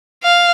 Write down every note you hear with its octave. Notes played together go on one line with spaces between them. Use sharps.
F5